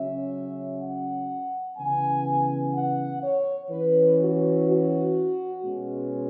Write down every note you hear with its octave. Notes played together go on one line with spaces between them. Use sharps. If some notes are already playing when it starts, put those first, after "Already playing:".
Already playing: C#3 F#3 C#4 E5
F#5
C#3 E3 B3 G#5
F#5
C#5
E3 C#4 B4
F#4
F#4
B2 G#3 C#4